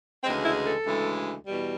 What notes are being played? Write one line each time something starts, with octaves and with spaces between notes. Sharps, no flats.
D2 C#3 E3 G#3 C4
E4
A4
D2 C#3 E3 G#3
E2 B2 G3